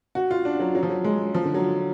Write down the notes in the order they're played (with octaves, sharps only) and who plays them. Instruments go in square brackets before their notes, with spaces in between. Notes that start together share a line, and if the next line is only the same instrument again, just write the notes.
[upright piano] F#4
F4
D4
F#3
F#3
F3
F#3
G#3
F3
D3
F#3